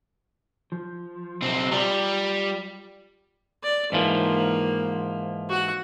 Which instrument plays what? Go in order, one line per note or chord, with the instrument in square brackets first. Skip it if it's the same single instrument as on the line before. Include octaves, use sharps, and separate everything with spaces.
[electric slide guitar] F3
[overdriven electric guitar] B1 C4
[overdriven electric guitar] G3 [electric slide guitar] F4 D5 A#5
[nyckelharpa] D5
[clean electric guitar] G#2 E3 F3 [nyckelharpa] A#3
[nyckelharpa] F#4 F#5